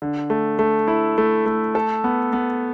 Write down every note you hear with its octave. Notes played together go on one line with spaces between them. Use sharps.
D3
A3
A3
E4
A3
A3
A4
B3
B3